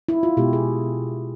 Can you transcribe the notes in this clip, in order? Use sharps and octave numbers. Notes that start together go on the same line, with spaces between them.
E4
F4
B2 G#3 G4
G#4